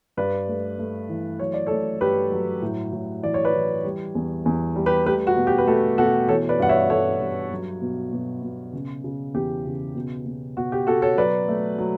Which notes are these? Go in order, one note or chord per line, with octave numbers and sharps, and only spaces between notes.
G2 B4 D5
A3
A3
E3
F#3 C#5
D5
A3 A4 C#5
G2 G4 B4
F#3
A2
A2
E3 D5
C#5
B4 D5
E3
G3
E2
E2
G3
G4 B4
A3 G4 B4
F#4
B2
G4
B4
A3 F#4 A4
B2 F#4 A4
E3 A4 C#5
B4 D5
G2 F#5
C#5 E5
G2 A4 C#5
G2
F#3
B2
B2
B2
C#3
C#3
E2 G4
C#3
B2
B2
B2 F#4
G4
B2 F#4 A4
A4 C#5
F#3 B4 D5
A3
F#3